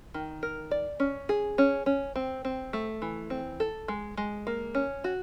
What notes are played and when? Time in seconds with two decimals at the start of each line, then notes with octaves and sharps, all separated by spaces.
0.14 D#3
0.43 A#4
0.71 D5
1.00 C#4
1.29 G#4
1.58 C#4
1.86 C#4
2.16 C4
2.45 C4
2.73 A3
3.02 E3
3.30 C4
3.60 A4
3.88 G#3
4.17 G#3
4.47 A#3
4.75 C#4
5.04 F#4